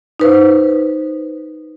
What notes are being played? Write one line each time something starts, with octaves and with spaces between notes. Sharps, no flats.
D#4 B4 C5